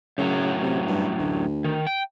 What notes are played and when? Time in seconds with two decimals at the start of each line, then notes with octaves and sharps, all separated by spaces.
0.18 F#2 A2 C#3 F#3
0.63 C3
0.87 G2
1.19 D2
1.64 D#3
1.87 G5